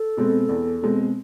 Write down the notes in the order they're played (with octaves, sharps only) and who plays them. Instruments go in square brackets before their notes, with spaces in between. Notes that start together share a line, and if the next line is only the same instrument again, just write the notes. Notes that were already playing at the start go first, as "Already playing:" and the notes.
Already playing: [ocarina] A4
[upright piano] B2 G#3 C4
E2
B2 G#3 C4